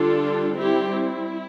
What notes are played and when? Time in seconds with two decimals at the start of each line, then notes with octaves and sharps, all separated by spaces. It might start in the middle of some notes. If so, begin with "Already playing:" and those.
Already playing: D3 G3 D4 F4 A4
0.58 G3 C4 E4 G4
0.91 E4